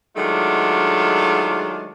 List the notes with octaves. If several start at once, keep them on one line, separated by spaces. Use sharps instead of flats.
D#3 F#3 G#3 A3 D4 F4